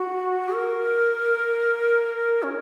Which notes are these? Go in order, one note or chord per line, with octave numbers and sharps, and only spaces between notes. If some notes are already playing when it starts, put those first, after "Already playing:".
Already playing: F#4
A#4
C#4